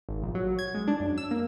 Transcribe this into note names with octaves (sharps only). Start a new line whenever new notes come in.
G#1
A#1
F#3
G#6
G#3
D4
F#2
E6
A#3